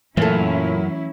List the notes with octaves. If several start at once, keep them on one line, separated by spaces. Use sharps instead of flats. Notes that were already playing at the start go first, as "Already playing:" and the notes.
F#2 A#2 E3 F#3 A3 C#4 E4 A4